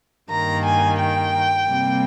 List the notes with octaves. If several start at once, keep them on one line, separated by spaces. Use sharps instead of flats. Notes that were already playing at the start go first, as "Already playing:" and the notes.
G2 D#3 A#3 A#5
G#5
G5
C3 G3 A#3